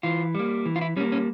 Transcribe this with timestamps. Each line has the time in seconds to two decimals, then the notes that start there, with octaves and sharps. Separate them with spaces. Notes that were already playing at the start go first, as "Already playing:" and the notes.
0.03 E3 F4
0.35 G3 A#3
0.66 E3
0.76 F4
0.81 E4
0.97 G3 C#4
1.00 A#3
1.12 C#4